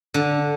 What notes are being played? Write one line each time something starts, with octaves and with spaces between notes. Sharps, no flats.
D3